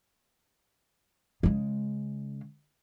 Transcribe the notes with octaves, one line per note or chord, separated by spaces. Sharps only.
C#3 G#3